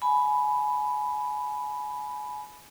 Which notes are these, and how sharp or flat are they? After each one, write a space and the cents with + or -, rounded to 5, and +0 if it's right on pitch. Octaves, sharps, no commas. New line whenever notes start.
G#5 +25 B5 +0